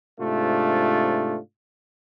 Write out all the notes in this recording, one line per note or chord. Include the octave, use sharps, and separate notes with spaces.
G#2 C3 A3 D4 F4